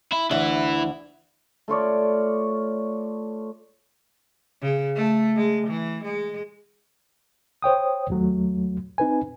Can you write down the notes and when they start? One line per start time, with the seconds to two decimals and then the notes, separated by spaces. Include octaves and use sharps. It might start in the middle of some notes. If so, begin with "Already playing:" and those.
0.13 E4
0.31 D2 E3 E4
1.68 A3 F4 C#5 D5
4.62 C#3
4.96 A3
5.36 G#3
5.67 E3
6.04 G#3
7.62 C5 C#5 G5 D#6
8.10 D#2 F#3 A3
8.98 C4 D#4 B4 G#5